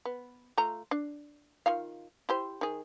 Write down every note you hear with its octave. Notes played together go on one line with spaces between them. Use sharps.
B3
A3 F4 A#5
D4
D#3 F4 F5
E4 G4 C5
D#3 G#4